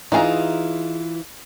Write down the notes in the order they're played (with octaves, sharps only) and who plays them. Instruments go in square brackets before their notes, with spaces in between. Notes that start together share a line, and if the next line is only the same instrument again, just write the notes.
[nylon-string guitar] E3 F4 [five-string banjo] D#4 G#4 A#5